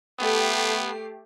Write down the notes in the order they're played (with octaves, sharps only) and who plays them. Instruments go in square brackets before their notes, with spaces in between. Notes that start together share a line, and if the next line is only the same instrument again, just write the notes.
[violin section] A3 G4 C7 [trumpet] B3